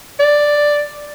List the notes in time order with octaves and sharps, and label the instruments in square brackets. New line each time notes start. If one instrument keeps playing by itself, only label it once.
[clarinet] D5